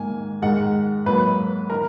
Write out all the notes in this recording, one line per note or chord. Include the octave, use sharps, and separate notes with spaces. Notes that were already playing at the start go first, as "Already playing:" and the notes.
Already playing: G#2 D#3 A#3 G#5
G#2 D#3 G#3 F#5
G#2 F#3 A#3 B4
D#3 A#4